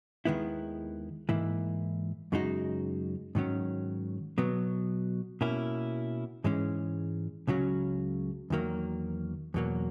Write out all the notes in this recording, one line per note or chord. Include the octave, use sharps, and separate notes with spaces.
D#2 D#3 G#3 B3 E4
G#2 E3 A#3 E4
F#2 C#3 G#3 D#4 F#4
G#2 D#3 F#3 C#4
B2 F#3 B3
B2 A#3 C#4 E4
G#2 E3 G#3 C#4
C#2 C#3 F#3 C#4 F#4
E2 D#3 F#3 A#3
E2 B2 F#3 A#3